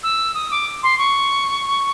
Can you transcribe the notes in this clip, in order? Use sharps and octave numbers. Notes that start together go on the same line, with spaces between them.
E6
D#6
D6
C6
C#6